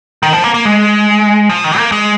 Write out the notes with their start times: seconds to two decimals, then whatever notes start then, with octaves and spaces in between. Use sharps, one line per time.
0.23 D#3
0.33 F3
0.44 A#3
0.54 A#3
0.65 G#3
1.49 F3
1.64 D#3
1.78 A#3
1.92 G#3